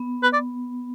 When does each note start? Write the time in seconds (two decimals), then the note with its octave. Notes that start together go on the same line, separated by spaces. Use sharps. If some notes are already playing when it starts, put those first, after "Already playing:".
Already playing: B3
0.23 B4
0.33 D5